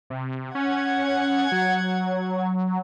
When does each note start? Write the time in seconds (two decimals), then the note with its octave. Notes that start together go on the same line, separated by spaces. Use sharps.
0.10 C3
0.55 C#4 F#5 G#6
1.52 F#3